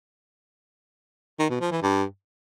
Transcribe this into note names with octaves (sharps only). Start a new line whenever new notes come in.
D#3
B2
F3
E3
G2